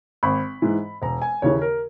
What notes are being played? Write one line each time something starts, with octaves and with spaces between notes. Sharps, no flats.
G#1 B5
G#2 E3
E1 A#5
G#5
D#2 C#3 E3 C#5
A#4